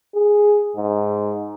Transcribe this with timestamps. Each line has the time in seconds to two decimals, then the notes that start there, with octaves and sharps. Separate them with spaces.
0.15 G#4
0.76 G#2